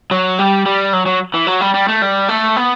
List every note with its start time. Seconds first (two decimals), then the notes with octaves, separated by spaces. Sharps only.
0.11 F#3
0.39 G3
0.66 G3
0.93 F#3
1.06 F#3
1.34 E3
1.47 F#3
1.61 G3
1.74 G3
1.89 A3
2.02 G3
2.29 A3
2.57 B3